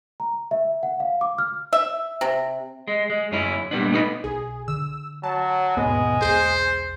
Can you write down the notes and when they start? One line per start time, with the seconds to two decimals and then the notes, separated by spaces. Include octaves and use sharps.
0.20 A#5
0.51 E5
0.83 F#5
1.00 F5
1.21 D6
1.39 F6
1.73 E5
2.21 C3
2.88 G#3
3.10 G#3
3.31 F#2 C#4 E4
3.71 A#2 G3 B3 D4
3.92 A3 B3 D#4 E4 B4
4.24 B1 G#4
4.68 D3 E6
5.23 F#3 A5
5.77 D#2 G#2 B2 G#3 B3
6.22 B1 E2 G#4 C5